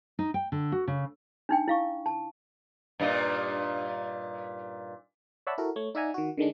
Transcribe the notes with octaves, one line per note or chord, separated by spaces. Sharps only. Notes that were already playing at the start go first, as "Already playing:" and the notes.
D#4
G5
D3
F#4
C#3
D4 D#4 G5
E4 F5 C#6
A5
G2 A#2 D#4
C#5 D5 E5 F#5 A5 B5
E4 F#4 A4 A#4
A3 C#5
D#4 D5 E5 F#5 G#5 A#5
D#3 F#4
D3 D#3 G#3 D4